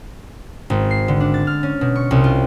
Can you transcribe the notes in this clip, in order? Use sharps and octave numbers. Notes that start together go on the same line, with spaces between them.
G#1
C7
D3
D4
A6
F6
C#4
B2
C#6
C2
F4